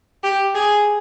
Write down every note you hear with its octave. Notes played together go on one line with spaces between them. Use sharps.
G4
G#4